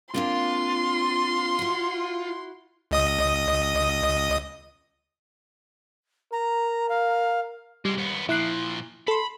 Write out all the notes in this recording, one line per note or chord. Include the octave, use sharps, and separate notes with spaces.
A#3 C4 D4 F4 C6
E4 F#4
C#2 D#5 D#6
A#4 A#5
F5
C3 G3 G#3
D#2 B3
A#2 F3 E4 F#6 C7
A4 B5 C6